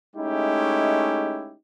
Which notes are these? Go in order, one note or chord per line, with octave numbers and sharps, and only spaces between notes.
G#3 A3 C#4 D#4 E4 G4